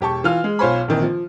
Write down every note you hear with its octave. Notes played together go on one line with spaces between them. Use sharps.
E1 G4 A5 C#6
E3 F4 F6
G#3
B1 F4 C5 C#5 G#5 B5
A#1 C3 D#3 E3
F3